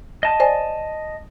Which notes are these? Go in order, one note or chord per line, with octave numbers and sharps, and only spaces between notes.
D#5 A5
C5 D5 G#5